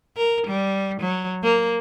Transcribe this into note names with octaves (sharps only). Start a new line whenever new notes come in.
A#4
G3
F#3
A#3